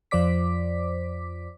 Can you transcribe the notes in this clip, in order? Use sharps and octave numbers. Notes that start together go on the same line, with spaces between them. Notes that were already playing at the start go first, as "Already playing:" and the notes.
F2 F3 C5 D5 D6 B6